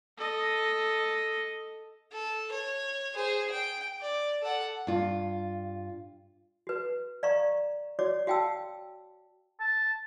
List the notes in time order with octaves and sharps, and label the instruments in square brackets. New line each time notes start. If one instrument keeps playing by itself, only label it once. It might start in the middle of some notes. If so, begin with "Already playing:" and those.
[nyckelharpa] A4 D#5
[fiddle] A4
C#5
G#4 C5
G5
D5
A4 F#5
[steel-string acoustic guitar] G2 F4
[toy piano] F#4 B4
D5 F5 A#5 C#6
F#4 C#5 D5 D6
F#4 F5 G5 A5 E6
[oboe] A5